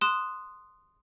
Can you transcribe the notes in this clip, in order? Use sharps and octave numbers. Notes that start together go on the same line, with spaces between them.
C6 D#6 F#6 E7